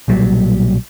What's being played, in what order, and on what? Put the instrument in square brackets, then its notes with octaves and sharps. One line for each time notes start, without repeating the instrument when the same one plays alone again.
[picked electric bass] B1 A#2 F#3 G3